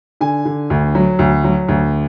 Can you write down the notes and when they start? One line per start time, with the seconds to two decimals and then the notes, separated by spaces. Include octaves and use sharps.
0.21 D3 G#5
0.45 D3
0.70 D2
0.95 F#3
1.19 D2
1.44 F#3
1.68 D2